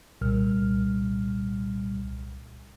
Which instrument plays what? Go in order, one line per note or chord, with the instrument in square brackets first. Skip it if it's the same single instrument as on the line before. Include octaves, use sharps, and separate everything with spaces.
[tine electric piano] C2 A#2 G3 F6